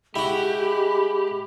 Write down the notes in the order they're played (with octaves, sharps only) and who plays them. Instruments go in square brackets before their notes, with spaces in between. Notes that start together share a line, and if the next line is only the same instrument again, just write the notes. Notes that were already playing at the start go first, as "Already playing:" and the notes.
[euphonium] G#3 [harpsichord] E4 F#4 [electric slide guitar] G4 [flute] B5